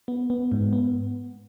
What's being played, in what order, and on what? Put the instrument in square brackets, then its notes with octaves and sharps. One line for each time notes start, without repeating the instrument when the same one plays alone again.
[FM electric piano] B3
B3
G#2
B3